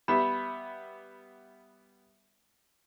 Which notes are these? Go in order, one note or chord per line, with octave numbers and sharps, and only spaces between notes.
G3 B3 E5 B5